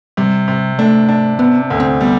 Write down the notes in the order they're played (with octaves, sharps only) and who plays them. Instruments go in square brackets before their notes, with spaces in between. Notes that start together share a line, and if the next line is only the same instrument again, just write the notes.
[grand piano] C3 [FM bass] G3
[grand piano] C3
[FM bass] A3 [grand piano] D4
[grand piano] D4
[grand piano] C3 [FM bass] B3
[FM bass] C4
[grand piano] D2
[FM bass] C4
[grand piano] G3 [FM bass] B3